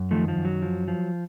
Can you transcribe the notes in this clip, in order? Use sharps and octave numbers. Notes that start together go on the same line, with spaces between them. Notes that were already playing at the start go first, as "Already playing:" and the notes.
Already playing: F#2
D#3 F3 A3
F3
F#2
F#3
F3
F3